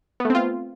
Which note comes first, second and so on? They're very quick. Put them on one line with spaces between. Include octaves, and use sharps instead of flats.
B3 A3 C4 F4